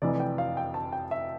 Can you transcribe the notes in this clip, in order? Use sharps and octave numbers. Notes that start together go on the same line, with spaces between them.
F1 F2 E3 D5
G5
F5
G5
A5
G5
E5